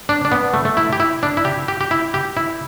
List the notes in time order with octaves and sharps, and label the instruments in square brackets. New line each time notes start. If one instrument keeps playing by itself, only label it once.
[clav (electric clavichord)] D4
D4
B3
A3
A3
E4
G4
E4
D4
E4
G4
G4
G4
E4
G4
E4